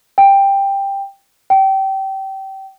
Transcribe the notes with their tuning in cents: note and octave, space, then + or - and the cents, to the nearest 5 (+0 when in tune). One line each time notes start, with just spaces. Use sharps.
G5 +10
G5 -25